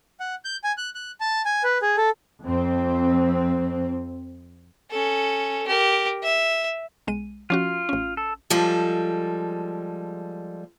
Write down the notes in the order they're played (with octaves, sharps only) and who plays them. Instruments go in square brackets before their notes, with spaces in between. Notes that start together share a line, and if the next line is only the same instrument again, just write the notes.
[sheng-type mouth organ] F#5
G6
G#5
F#6
F#6
A5
G#5
B4
G#4
A4
[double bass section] F2 C4
[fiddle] C#4 A4
G4 A#4
E5
[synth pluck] B1 G#3 D#7
[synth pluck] F3 C#4 F#4 [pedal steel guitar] F4
[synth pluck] A1 C#4
[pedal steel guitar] A4
[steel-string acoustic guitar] F3 G3 G#3 A4